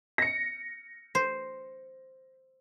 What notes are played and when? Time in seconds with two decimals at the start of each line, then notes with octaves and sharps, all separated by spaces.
0.18 A#6 C#7
1.15 C5